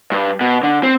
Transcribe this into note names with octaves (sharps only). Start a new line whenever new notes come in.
G2
B2
D3
C4